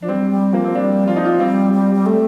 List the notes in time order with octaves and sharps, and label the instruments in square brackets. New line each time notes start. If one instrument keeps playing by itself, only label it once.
[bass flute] F3 [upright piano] D4
[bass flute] G3 [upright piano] C4
[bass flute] G3
[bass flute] F3 [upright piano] A#3
[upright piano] C4
[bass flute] G3 [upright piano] D4
[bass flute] F3 [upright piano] F4
[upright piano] D#4
F4
[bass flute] G3 [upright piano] C4
[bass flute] G3
G3
A3